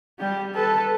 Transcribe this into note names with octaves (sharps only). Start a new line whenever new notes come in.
G3 G4
A4 B4